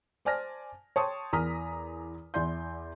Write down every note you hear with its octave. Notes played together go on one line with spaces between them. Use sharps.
C5 D5 G#5 A5 F6 A#6
C#5 G5 A5 C6 C#6 D#6
E2 A#4 A#5 D#6 F6 B6
E2 E4 D5 C6 G6